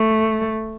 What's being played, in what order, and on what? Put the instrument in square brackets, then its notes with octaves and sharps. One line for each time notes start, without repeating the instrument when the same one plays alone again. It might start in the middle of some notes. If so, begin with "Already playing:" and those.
Already playing: [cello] A3